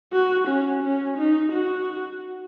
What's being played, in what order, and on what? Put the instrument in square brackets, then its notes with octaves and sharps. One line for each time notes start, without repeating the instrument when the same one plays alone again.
[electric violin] F#4
C#4
C#4
D#4
F#4